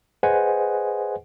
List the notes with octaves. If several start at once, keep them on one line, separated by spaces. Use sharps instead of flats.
G#4 B4 C5 D#5 F#5 G#5